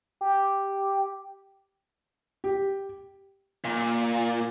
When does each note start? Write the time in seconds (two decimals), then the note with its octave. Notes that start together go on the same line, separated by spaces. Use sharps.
0.21 G4
2.44 G4
3.65 A#2